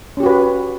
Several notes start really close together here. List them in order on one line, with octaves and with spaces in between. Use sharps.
C#4 G4 F#4 B4